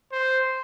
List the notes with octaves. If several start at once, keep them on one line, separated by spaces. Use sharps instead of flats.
C5